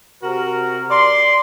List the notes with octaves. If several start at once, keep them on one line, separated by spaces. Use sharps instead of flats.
C3 F#4 A#4
D5 C6